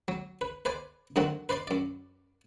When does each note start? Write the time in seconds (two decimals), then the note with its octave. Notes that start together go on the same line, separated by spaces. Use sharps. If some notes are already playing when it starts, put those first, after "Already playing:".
0.08 F#3
0.41 B4
0.65 B4 C5 D5 G#5
1.16 G2 D3 D#3 F#3 C4 F#5
1.49 B4 C5 D5 C6
1.67 F#2 D5